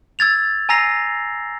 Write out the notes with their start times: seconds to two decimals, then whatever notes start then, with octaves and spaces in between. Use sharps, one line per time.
0.19 E6 G#6 A6 F7
0.69 G#5 A#5 E6 A#6 C7 F7